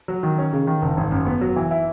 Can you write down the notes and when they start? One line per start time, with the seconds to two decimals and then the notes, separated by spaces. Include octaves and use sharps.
0.08 F#3
0.23 D#3
0.38 C#4
0.53 C#3
0.67 D#3
0.82 F#1
0.97 G#1
1.12 F#2
1.27 B3
1.41 F#3
1.56 E3
1.71 E4